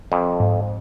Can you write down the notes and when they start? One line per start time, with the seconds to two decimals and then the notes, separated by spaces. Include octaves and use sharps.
0.12 F2
0.40 G#2